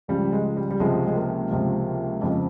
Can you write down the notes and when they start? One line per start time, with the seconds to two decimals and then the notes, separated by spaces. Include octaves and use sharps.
0.08 C#2 C#3 F3 G3
0.32 G#3
0.57 G3
0.70 G3
0.80 C#2 C3 F3 G#3
1.06 G#3
1.16 A#3
1.51 C#2 C3 F3
2.21 F2 C#3 F3 G#3